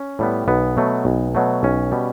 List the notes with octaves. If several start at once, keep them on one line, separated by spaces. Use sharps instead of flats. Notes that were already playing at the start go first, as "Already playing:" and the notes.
Already playing: C#4
A2 G3 B3
B1 B3
B2 F#3 A3
B1
B2 F#3 A3
B1 C#4
B2 G3